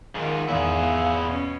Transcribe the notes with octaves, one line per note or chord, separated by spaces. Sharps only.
G#2 D#3 F4
E2 G#2 E4 G#4 F5
B3
B2 C#4